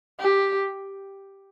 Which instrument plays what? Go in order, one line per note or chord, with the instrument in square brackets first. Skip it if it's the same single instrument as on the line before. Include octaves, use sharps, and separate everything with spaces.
[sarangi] G4